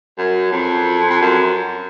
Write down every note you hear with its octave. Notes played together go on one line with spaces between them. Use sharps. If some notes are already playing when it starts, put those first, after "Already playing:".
F#2
F2
F2
F#2